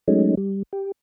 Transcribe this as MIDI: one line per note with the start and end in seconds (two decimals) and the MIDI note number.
0.08 0.35 54
0.08 0.35 56
0.08 0.35 57
0.08 0.35 61
0.08 0.35 63
0.37 0.63 55
0.73 0.92 67